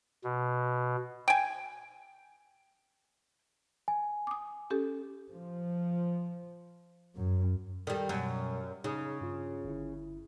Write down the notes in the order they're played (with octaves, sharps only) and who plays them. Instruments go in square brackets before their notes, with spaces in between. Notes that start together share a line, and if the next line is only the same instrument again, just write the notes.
[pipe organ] B2
[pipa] G5 G#5
[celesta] G#5
[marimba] D6 D#6
C#4 G4 A4
[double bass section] F3
F#2
[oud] D#3 G3 [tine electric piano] A4 D5
[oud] F#2 [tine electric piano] B2 G3
[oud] C#3 [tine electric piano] D#4 G#4 D#6
[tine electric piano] G2 F4
G1 E4